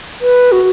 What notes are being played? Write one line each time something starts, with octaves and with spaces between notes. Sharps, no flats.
B4
F#4